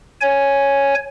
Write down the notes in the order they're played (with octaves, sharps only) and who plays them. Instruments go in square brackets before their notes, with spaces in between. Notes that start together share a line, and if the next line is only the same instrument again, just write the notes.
[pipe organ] C#5 G#5